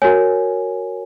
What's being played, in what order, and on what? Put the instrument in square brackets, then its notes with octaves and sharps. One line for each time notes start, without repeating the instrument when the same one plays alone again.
[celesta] F#4 A#4 C#5 G#5